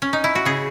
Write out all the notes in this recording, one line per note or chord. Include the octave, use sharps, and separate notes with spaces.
C#4
D#4
E4
F#4
C#3 G#4